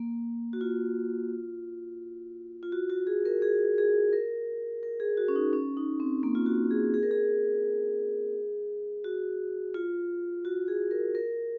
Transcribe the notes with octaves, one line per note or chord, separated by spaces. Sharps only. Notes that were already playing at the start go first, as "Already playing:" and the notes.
Already playing: A#3
F#4
F4
F4
F#4
F#4
G#4
A#4
G#4
G#4
A#4
A#4
G#4
F#4
C#4
D#4
C#4
D#4
C4
A#3
F4
F#4
G#4
G#4
A#4
G#4
F#4
F4
F#4
G#4
A#4
A#4